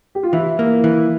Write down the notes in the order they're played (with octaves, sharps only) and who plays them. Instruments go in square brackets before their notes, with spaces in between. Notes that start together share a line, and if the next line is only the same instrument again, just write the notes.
[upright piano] G4
F4
[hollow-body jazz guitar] E3 [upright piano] E4
[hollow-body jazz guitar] A#3
E3